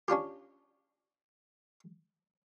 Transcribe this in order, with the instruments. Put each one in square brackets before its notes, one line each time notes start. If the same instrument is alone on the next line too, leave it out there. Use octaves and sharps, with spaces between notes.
[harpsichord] C#4 D4 F4 G4